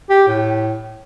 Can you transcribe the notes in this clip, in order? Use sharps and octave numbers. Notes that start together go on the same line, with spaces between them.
G4
A2